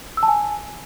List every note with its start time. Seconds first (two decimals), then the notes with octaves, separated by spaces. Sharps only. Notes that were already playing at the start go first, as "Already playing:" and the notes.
0.17 E6
0.23 A5
0.28 G#5